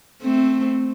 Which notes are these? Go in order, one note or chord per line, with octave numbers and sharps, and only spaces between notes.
A3 C4